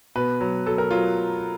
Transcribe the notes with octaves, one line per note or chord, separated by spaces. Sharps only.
B2 B4
F#3
F#3 A4
A#4
F#3 F4